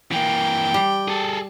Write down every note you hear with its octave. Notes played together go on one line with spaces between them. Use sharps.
E3 A#3 G5
G3
G#4 A4